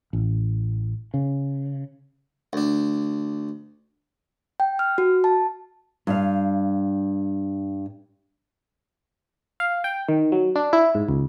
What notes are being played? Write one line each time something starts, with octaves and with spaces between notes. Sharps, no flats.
A1
C#3
D2 D4
G5
F6
F#4
A5
G2 F5
F5
G5
D#3
F#3
D4
E4
G#2
C#2